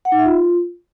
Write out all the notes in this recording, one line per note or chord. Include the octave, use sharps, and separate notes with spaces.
F#5
D#4
E5
F4